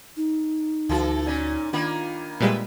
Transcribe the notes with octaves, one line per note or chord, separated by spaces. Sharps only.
D#4
D2 E3 F#4 A4
A#2 C#4
D#3 A#3 D4 F4 B5
A#2 G3 G#3 B4 E5